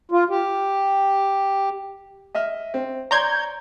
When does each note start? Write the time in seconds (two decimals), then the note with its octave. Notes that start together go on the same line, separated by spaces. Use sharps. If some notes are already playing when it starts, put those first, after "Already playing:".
0.12 F4
0.30 G4
2.35 D#5 E5 F6
2.74 C4
3.11 C#5 D5 A#5 C6 G6 G#6